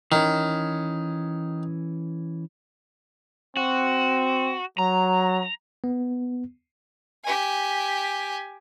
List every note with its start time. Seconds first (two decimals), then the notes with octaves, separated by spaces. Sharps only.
0.12 D#3 E3 C#4
3.57 C4 F#4
4.79 F#3 A#5
5.84 B3
7.24 G4 G#5